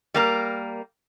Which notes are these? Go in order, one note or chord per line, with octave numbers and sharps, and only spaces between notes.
G3 A#3 A#4